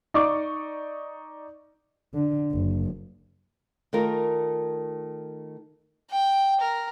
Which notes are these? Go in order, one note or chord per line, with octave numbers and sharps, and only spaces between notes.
D#4 D5 C#6 D6
D3
F#1
D#3 A3 F4 A#4
G5
A#4